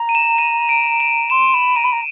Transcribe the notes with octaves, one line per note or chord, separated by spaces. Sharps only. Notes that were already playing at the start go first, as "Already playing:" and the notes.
Already playing: A#5
D#7
E7
D#7
D7
E7
C6 E7
B5 E7
A#5 D#7
B5
A#5